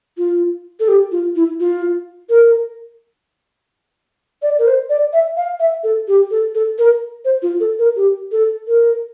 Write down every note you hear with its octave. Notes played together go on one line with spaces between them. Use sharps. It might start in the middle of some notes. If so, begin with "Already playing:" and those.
F4
A4
G4
F4
E4
F4
A#4
D5
A#4
C5
D5
E5
F5
E5
A4
G4
A4
A4
A#4
C5
F4
A4
A#4
G4
A4
A#4